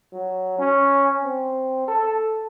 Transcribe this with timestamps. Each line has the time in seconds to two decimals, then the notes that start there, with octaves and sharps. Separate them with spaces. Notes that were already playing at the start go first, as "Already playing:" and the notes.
0.13 F#3
0.59 C#4
1.24 C4
1.88 A4